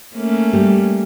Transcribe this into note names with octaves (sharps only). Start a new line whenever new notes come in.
A3 A#3 C#4
G3